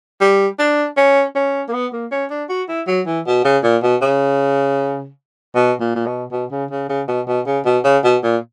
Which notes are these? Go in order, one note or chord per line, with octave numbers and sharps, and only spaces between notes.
G3
D4
C#4
C#4
A#3
B3
A#3
C#4
D4
F#4
E4
F#3
E3
B2
C#3
A#2
B2
C#3
B2
A#2
A#2
B2
B2
C#3
C#3
C#3
B2
B2
C#3
B2
C#3
B2
A#2